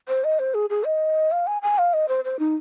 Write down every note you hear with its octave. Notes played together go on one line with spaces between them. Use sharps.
C5
D#5
C5
G#4
G#4
D#5
F5
G#5
G#5
F5
D#5
C5
C5
D#4